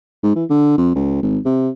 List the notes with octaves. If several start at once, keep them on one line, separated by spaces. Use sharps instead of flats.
G#2
E3
D3
F2
C#2
G#1
C3